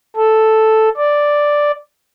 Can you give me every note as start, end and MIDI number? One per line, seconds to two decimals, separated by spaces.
0.16 0.89 69
0.97 1.71 74